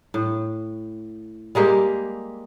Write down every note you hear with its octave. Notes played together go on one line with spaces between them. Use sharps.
A2
G3 G#3 A#3 G4